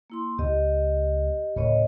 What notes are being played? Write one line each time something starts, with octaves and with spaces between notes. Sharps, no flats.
A#3 E4 C6
C#2 B3 G4 D#5
D1 A2 C#3 A#4 C#5 D#5